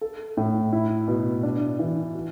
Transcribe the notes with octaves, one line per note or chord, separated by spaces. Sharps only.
A4
A2
E4
B2
D4
E3
F#4